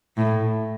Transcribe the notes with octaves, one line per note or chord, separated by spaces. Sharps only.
A2